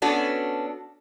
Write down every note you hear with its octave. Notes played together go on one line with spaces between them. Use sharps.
B3 C#4 D4 F#4 A4